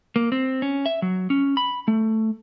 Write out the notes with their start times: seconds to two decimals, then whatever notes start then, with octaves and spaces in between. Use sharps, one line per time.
0.16 A#3
0.32 C4
0.62 C#4
0.86 E5
1.02 F#3
1.30 C#4
1.57 B5
1.88 A3